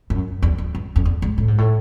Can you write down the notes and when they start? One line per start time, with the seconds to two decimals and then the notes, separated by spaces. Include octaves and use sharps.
0.10 F#2
0.42 E2
0.58 F2
0.75 G2
0.96 F2
1.05 E2
1.22 G#2
1.38 A2
1.48 G#2
1.58 A2